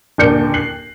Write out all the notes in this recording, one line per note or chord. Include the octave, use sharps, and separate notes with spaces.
D#1 D#2 D3 D5 G6 C#7
F#6 C7 F#7